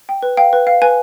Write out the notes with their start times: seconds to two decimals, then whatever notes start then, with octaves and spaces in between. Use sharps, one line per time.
0.09 G5
0.22 B4
0.37 F5 G5
0.53 B4
0.67 F5
0.82 B4 G#5